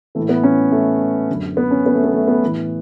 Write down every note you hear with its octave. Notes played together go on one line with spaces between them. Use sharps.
A2 E3 A3
B3
C#4
A3
F#2 D3
B3
C#4
B3
A3
B3
A3
B3
A2 E3